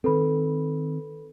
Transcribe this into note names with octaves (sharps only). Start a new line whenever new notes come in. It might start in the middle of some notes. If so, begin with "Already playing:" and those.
D#3 C4 A4 B4 B5